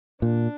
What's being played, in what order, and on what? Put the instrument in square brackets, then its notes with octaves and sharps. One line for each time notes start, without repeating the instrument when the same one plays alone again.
[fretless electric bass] A#2 [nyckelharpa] D4